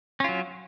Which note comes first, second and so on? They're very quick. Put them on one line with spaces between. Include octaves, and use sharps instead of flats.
C#4 F4 F#3